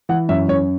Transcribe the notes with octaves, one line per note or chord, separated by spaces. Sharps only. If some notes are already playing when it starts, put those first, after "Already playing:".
E3 F#5
F#2 E5
F#2 C#5